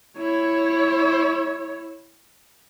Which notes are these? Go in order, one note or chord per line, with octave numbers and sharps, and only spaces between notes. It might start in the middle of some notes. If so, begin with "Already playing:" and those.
E4 C#5